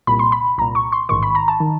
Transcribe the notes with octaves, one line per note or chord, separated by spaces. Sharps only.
C2 A#2 B5
C6
B5
C2 A#2 A#5
C#6
C6
A1 G#2 D#3 C#6
B5
A#5
A5
D#3